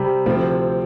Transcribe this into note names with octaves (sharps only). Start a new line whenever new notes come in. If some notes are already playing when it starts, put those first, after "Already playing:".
Already playing: C3 G3 C4
D2 C3 F3 C4